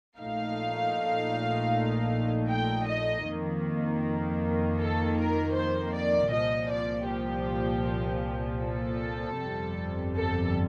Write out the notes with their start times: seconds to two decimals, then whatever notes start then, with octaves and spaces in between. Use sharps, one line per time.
0.20 A#1 A#2 A3 D#4 F5
2.49 G5
2.87 D#5
3.26 F2 D#3 A#3
4.79 A4
5.17 A#4
5.55 C5
5.95 D5
6.33 C2 A#2 F3 D#5
6.71 D5
7.09 G4
8.62 A4
9.40 G1 F2 C3 G3
10.16 A4